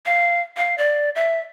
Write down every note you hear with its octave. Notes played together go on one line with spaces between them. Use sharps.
F5
F5
D5
E5